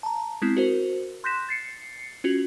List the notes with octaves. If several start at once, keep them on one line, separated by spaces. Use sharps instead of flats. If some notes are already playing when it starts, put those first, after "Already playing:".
A5 A#5
G#3 B3 C4 E4
F#4 A#4 C5
C6 F#6 G6 A#6 B6 E7
A6 C7 C#7
C#4 F4 F#4